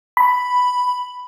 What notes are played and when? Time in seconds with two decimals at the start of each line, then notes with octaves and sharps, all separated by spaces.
0.17 B5